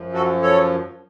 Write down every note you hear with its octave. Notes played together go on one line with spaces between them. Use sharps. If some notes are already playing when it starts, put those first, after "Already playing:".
Already playing: F#2 F3
F#4 A4
A4 C#5